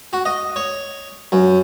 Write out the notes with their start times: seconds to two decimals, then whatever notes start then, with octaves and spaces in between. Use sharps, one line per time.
0.13 F#4
0.25 D#5
0.56 C#5
1.32 F#2